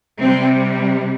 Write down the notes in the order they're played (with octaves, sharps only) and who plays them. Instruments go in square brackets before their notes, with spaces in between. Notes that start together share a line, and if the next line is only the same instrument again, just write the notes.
[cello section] C3 G3 C4